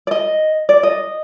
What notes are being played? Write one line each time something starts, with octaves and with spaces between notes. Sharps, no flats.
D5
D#5
D5
D#5